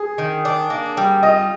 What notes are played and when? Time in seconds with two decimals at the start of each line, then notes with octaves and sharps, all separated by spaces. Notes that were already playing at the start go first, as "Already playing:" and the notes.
Already playing: G#4
0.18 D#3
0.45 D4
0.70 A#3
0.97 G3
1.23 F4 D#5